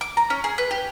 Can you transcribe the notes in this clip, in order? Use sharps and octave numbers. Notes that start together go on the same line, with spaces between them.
D6
A#5
C#4
G#4
B4
G4